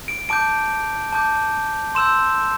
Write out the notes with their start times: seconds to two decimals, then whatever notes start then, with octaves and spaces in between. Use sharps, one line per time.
0.08 D7
0.29 A5 D6 G6 D7
1.12 A5 D6 G6
1.95 C6 E6 G6 E7